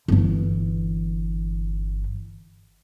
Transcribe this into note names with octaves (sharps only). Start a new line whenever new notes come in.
G1 E3